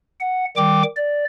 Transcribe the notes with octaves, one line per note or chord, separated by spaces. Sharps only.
F#5
D#3 G3 G5 D6
D5